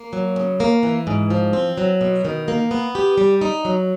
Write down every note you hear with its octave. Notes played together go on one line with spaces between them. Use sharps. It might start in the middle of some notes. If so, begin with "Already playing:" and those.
Already playing: A#3
F#3
C#3
A#3
E3
G#2
F3
C4
F#3
B2
D#3
A#3
B3
G4
G3
D#4
F#3